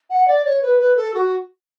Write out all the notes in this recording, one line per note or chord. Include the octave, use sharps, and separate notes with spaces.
F#5
D5
C#5
B4
B4
A4
F#4